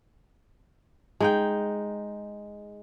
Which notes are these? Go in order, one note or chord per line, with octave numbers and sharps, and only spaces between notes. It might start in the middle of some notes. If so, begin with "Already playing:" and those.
G#3 D#4 G5